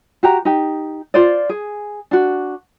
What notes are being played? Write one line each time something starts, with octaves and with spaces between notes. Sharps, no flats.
F#4 G4 A#5
D#4 G4
F4 C5 D5
G#4
D4 F#4